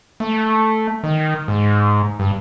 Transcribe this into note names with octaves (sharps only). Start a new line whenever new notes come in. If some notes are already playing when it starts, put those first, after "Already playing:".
A3
D#3
G#2
G2